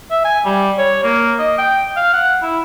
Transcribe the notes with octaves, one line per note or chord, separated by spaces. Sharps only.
E5
G#5
G3
C#5
A#3
D#5
G5
F5
F#5
E4